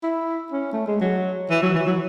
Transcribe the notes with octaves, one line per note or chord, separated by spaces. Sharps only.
E4
C#4
A3
G#3
F#3
E3
F#3
E3
F#3